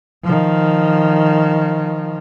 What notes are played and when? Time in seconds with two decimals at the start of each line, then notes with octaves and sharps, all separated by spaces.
0.24 D#3 F3